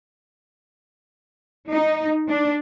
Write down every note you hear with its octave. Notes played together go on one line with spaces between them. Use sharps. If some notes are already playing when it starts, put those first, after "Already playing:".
D#4
D4